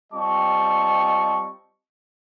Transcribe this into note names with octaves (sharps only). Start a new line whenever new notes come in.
G3 C4 F4 D#5 A5 C#6